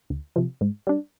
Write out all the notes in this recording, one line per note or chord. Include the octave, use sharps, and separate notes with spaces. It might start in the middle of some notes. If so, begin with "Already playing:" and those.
D2
C3 F3
G#2
G3 D4